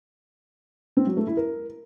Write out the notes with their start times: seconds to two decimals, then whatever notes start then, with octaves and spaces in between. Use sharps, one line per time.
0.97 C4
1.07 F#3
1.17 A3
1.27 E4
1.37 A#4